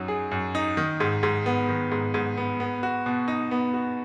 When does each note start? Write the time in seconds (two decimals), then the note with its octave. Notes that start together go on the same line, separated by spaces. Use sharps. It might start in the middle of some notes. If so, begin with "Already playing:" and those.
Already playing: F#2 F#3 D#4
0.08 G#4
0.31 F#2
0.55 D#4
0.77 D#3
1.00 G#2
1.23 G#2
1.46 B3
1.69 D#3
1.91 G#2
2.14 G#2
2.37 B3
2.60 B3
2.83 F#4
3.06 B2
3.28 D#4
3.51 B3
3.74 F#4